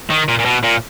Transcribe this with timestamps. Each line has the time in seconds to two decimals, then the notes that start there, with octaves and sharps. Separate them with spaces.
0.10 D#3
0.28 A#2
0.39 A#2
0.45 B2
0.63 A#2